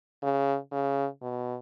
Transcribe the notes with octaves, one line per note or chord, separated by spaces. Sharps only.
C#3
C#3
B2